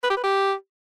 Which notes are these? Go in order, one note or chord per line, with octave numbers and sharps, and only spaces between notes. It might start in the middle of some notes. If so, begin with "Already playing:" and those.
B4
G4
B4
G4